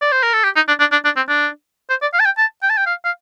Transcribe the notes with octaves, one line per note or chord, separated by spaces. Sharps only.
D5
C5
A#4
A4
G4
D#4
D4
D4
D4
D4
C4
D4
C5
D5
F5
A5
G5
A5
G5
A5
G5
F5
F5